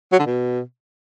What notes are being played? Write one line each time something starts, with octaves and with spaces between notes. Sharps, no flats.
F#3
D3
B2